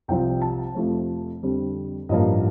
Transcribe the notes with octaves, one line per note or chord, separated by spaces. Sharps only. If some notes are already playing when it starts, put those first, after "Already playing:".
C2 C3 F3 C4 G5
A5
F2 C3 F3 A3 C4
F2 D3 G3 C4
A1 G2 F3 A#3 D#5